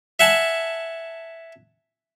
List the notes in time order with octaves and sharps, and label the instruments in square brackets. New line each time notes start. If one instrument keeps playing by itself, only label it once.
[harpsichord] E5 F#5 G#5 A5